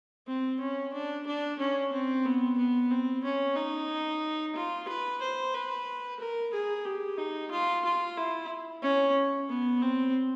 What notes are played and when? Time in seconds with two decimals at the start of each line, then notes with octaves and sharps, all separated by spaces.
0.27 C4
0.60 C#4
0.93 D4
1.27 D4
1.59 C#4
1.93 C4
2.25 B3
2.58 B3
2.90 C4
3.24 C#4
3.56 D#4
4.56 F4
4.88 B4
5.21 C5
5.54 B4
6.19 A#4
6.53 G#4
6.85 G4
7.18 D#4
7.51 F4
7.85 F4
8.17 E4
8.82 C#4
9.49 B3
9.82 C4